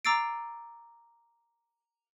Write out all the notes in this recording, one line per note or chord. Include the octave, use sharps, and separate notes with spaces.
A#5 D6 E6 A6 C7 D7